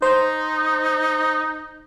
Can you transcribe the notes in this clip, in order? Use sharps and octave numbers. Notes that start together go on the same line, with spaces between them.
D#4 C5